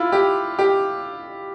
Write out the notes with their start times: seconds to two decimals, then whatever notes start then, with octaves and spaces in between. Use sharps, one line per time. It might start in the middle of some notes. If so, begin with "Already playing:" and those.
Already playing: E4 F4
0.12 G4
0.59 G4